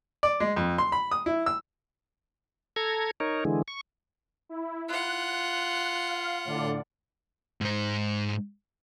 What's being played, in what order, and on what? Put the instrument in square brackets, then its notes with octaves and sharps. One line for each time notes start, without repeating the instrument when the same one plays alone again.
[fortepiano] D5
G#3
F2
C6
B5
D#6
E4
E6
[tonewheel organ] A4 A#5 G#6
D#4 A#4 C#5
D3 E3 G#3
C#6
[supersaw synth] E4
[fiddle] F4 F#5 [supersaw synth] F#6
[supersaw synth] F5
A2 D3 D5
[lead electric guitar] G#2 C5